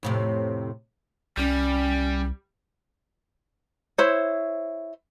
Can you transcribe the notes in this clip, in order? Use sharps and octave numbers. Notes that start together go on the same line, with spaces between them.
F2 A2 C3
C2 G3 C#4
E4 C5 C#5